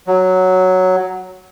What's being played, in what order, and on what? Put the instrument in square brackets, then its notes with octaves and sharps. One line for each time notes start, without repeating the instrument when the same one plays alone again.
[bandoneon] F#3